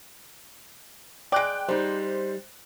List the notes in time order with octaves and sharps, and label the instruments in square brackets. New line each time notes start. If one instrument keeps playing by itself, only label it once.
[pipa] G#3 D5 [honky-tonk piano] G5 F#6 D7
[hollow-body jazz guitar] G3 D#4 [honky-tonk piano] C5